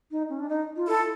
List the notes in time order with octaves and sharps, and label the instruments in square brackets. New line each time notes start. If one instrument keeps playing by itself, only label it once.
[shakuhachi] D#4
C#4
D4
D#4
F4
[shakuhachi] E4 [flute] A4